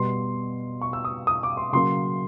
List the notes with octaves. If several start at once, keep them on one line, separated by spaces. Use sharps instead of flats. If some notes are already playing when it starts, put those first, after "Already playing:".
Already playing: B2 G3 B3 C6
C#6
E6
D#6
D#6
D6
C6
C#3 F#3 A#3 C6